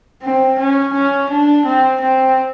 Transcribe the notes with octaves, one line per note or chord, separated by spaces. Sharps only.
C4
C#4
C#4
D4
C4
C4